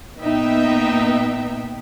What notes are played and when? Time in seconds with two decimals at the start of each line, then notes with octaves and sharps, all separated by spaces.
0.20 A#2 B3 D#4 E5 G5